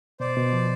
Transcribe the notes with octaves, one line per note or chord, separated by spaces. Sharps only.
B2 C5 D5
B2
F3